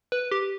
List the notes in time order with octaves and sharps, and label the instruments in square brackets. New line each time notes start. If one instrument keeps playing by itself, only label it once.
[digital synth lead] B4
G4